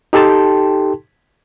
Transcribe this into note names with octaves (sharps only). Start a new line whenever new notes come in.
D#4 G4 A4 G5 A5 C6